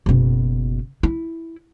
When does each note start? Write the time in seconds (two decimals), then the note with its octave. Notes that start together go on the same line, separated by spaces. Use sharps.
0.06 F#1 B2
1.03 E4